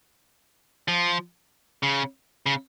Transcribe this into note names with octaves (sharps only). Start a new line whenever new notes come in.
F3
C#3
C#3